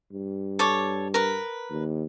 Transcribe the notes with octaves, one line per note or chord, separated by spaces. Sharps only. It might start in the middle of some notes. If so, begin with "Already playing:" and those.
G2
A4 C#5 D6
A#4 B4
D#2